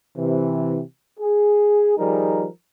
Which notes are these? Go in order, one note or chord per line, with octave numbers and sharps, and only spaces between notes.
C3 E3
G#4
D#3 F3 G3 D#4 G#4 A#4